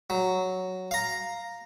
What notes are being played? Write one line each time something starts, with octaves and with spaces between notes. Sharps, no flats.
F#3
F5 A#5